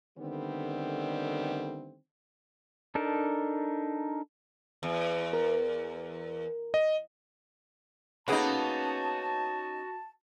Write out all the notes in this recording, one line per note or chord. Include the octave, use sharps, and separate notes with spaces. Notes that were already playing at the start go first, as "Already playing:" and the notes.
D3 D#3 G3 A3 B3 C4
D4 D#4 A4 A#4
E2
A#4
D#5
A#3 B3 C#4 D#4 F#4 G#4 A5 B5